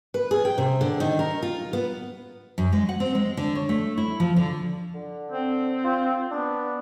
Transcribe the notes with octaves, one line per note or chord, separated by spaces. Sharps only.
B4
G#4
G5
C3
D3
D#3
A#4
F4
B3
F#2
G#3
F#5
C4
G#3
D3
C#5
A3
E4
F3
D3
D3
C4
F4
B3 D4